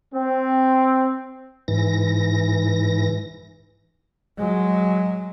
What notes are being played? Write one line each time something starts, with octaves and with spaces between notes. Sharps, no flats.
C4
G#2 E3 A#6
F#3 G#3